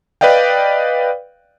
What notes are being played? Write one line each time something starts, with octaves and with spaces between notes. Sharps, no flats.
B4 D5 D#5 F5 G5